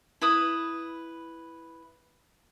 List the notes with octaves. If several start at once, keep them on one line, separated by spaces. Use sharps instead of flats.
E4 B4 D#6